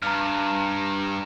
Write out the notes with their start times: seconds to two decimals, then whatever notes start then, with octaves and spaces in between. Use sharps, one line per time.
0.02 G2 A#5 F6